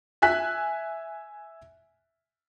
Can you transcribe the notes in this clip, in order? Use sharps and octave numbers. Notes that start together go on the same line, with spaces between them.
E5 G#5 F#6 B6